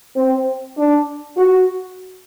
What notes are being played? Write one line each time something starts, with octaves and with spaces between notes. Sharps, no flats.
C4
D4
F#4